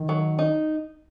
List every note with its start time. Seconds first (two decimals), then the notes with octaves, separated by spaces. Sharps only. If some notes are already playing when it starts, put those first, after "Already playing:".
Already playing: D#3
0.09 F#3
0.39 D#4